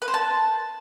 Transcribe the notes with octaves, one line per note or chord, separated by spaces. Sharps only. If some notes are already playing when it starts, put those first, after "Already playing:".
B4
C5
A5